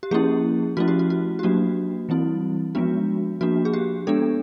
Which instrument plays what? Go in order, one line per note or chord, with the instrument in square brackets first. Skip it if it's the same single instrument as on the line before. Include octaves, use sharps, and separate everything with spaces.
[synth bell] G4
F3 A#3 C#4 E4 G#4
F3 A3 C#4 E4 F#4
G4
F#4
F#4
G4
F#3 A#3 D4 F#4
E3 G3 C4 E4
F3 G#3 B3 D4 F#4
F3 A#3 D4 F#4
G#4
G4
G#3 B3 D4 A4